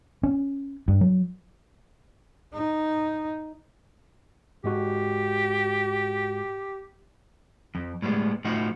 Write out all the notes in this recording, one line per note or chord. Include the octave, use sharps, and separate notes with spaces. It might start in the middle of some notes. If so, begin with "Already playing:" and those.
C#4
G2
F#3
D#4
G#2 G#3 F#4 G4
F2
A2 G3 G#3 B3
A2 F3 D#4 F#4